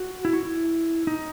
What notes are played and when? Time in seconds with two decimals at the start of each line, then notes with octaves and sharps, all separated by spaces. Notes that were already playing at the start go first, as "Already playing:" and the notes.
Already playing: F#4
0.25 E4
0.33 F#4
0.43 E4
1.07 D#4